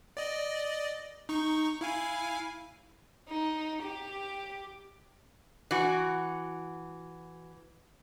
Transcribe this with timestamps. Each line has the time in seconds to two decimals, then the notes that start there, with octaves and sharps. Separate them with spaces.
0.17 D5 D#5
1.29 D#4 C#6
1.81 E4 F5 G#5
3.29 D#4
3.83 G4
5.71 E3 F#4